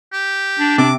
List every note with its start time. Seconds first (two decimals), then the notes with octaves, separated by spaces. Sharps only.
0.13 G4
0.59 D4
0.78 C3 D6